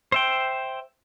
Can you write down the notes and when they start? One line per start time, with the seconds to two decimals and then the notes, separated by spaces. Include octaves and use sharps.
0.12 C5 E5 G5